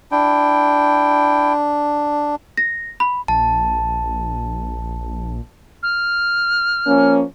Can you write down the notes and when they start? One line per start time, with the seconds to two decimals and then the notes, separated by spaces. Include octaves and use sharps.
0.11 D4 E4 G5
2.57 A#6
3.00 B5
3.28 A#1 A5
5.83 F6
6.87 F3 A#3 C#4